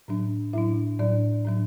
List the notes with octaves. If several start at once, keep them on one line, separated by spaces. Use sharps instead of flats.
A2 F#3 D4
A2 F#3 D4 E4 E5
A2 F#3 D4 D5
A2 F#3 D4